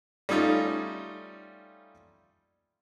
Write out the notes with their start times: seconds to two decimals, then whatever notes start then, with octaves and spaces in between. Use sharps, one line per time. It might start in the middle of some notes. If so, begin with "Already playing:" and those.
0.29 G3 A3 C#4 D#4 F4